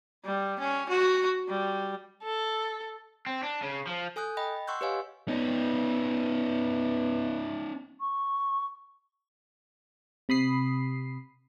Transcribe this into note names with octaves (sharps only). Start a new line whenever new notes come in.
G3
C#4
F#4
G3
A4
C4
D4
C#3
F3
A4 G#5 D#6 F#6 G6
D#5 G5 B5 A#6
F#5 C6 C#6 E6 F#6 G6
G4 B4 C#5 D#5 F5 G#5
B3 C#4 D#4
C#6
C3 B5 D#6 C7